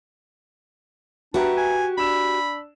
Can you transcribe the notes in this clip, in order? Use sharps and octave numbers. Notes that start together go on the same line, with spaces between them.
D4 F#4 G4 B4 E5 A#5
G#5
D4 B5 E6 E7